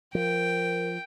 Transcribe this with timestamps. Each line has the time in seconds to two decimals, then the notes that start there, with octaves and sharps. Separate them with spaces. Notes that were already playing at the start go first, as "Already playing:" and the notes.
0.15 F3 A#4 G5